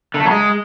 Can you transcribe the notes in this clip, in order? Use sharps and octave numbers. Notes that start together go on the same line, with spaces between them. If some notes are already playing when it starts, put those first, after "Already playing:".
D3
A3
F#3
G#3